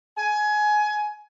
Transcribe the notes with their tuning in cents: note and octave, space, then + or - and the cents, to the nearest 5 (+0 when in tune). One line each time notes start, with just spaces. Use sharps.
G#5 +20